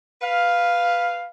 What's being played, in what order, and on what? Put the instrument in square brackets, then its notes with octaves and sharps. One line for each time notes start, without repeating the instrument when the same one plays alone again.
[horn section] B4 F5